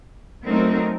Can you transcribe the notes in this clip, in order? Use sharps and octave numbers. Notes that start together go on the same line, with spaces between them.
F#3 A3 C4 D#4 A#4